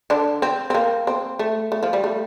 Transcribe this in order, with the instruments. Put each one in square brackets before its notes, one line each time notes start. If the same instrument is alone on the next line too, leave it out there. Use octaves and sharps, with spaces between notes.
[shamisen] D3 D4
C4
C4
A#3
C4
A3
A3
F3
G3
A3